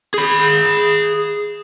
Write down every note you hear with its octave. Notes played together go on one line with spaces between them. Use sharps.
G#4 B5